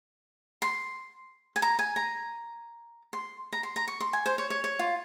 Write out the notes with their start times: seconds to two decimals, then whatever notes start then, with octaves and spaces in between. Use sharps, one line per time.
0.62 C6
1.56 G#5
1.62 A#5
1.79 G#5
1.96 A#5
3.13 C6
3.53 A#5
3.63 C6
3.76 A#5
3.88 C#6
4.00 C6
4.13 G#5
4.26 C5
4.38 C#5
4.50 C#5
4.64 C#5
4.79 F4